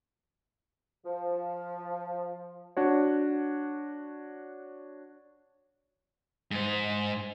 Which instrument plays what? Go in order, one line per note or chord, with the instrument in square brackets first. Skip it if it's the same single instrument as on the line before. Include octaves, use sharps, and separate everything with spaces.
[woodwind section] F3
[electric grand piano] D4 F#4 C#5
[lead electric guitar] G#2 C5